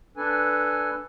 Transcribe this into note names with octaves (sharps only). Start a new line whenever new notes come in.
D4 A4 B4 G#5